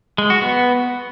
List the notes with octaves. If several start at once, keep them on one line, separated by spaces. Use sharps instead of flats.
G#3
F#4
B3